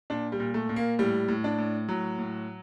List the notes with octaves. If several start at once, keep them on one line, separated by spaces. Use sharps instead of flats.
A#2 D4
G3
A#2
A3
A#2
A#3
A2 G3
A2
D4
A2
A2 F#3
A2